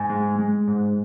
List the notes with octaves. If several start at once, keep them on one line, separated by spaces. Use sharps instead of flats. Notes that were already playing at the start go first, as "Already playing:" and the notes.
Already playing: G#2 G#5
G#3
G#3
G#2